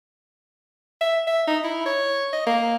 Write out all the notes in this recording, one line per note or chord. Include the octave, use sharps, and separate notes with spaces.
E5
E5
D#4
E4
C#5
D#5
A#3